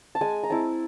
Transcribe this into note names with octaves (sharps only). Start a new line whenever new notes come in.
A5
G#3 G#5
A#5
C4 E4 A5